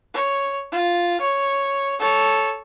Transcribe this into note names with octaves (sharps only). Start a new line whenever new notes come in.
C#5
F4
C#5
A4 C#5